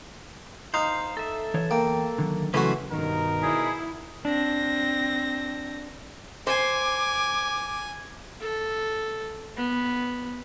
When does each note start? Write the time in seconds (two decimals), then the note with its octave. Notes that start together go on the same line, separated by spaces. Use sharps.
0.74 D#4 C5 F5
1.17 A4 E5
1.54 E3 C#5
1.71 E2 A#3 G5
2.18 D3 D#3 F#3
2.54 C#3 E3 F#3 A3 C#4 F#4 B4 C5
2.92 G2 B2 D#3 D#4 A#4
3.43 E4 G#4 D5 B5 G6
4.25 C4 D4 A#6
6.47 C5 G#5 D6
8.41 A4
9.57 B3